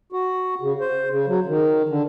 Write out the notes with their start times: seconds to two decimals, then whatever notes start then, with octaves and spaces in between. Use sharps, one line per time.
0.12 F#4
0.61 C#3
0.81 C5
1.10 C#3
1.27 F#3
1.46 D#3
1.89 D3